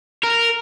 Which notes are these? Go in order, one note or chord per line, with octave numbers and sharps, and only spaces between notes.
A#4